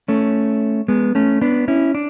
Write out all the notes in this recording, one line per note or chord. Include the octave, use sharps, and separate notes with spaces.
A3 C#4
G#3 B3
A3 C#4
B3 D4
C#4 E4
D4